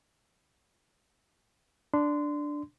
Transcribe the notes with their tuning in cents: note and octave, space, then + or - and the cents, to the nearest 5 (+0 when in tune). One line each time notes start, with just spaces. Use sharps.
D4 +0 C6 -25